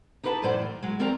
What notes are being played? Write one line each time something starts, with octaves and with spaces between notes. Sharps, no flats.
D#4 G4 G#4 B4 G5 A5
F#2 A2 E3 C5 D5 F#5
D#3
F#3 G#3
D#3 C4 G4 A#4 D5 A#5